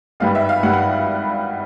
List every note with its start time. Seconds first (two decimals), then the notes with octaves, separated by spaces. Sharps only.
0.20 G#1 G2 D#3 G3 B3 F5
0.35 E5
0.49 F5
0.63 G#1 G2 D#3 G3 B3 F#5
0.73 F#5